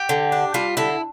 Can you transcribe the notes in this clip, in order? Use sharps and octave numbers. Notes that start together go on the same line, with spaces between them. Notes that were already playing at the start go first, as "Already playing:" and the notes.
Already playing: G4
D3
D4
G3 F4
D3 E4